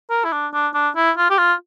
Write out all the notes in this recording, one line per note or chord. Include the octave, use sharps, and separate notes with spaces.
A#4
E4
D4
D4
D4
E4
F4
G4
F4